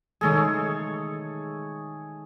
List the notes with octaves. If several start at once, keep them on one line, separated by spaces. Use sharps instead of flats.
D#3 G#3 A3 G#4 A4 C#5